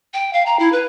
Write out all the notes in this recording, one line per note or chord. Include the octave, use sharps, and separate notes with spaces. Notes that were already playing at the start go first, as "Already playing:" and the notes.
G5
F5
A#5
E4
B4